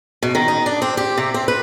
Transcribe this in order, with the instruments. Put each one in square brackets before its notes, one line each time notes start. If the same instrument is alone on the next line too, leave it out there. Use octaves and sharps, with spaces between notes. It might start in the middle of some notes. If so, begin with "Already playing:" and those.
[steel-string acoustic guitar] B2
D#3
D#4
D4
C4
G4
C3
C4
B4